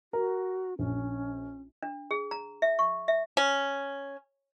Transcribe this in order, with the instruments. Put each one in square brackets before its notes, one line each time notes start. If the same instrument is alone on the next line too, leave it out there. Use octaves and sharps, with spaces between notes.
[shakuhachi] F#4 [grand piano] A#4
[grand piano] A#1 [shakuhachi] C#4
[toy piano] D4
G#4
A#5
E5
C#6
E5
[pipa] C#4